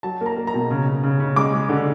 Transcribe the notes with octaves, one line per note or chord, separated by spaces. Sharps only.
F#3 A5
A#3 A#5
A#3
A#5
B2
C#3
C#3
C#3
C#3
G#3 D6
G#3
D3